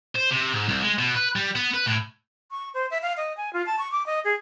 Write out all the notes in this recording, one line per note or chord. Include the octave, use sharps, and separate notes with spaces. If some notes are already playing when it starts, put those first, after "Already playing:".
C5
C3
G#2
C2
G#3
B2
B4
G3
B3
B4
A2
C#6
C5
E5
F5
D#5
G#5
F4
A5
C#6
D6
D#5
G#4